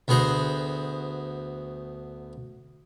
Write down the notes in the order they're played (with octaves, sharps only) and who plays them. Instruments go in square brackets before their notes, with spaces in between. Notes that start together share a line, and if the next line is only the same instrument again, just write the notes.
[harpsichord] D2 B3 G#4 C5 A#5